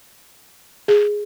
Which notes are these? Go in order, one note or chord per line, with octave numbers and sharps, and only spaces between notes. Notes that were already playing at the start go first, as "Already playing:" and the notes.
G#4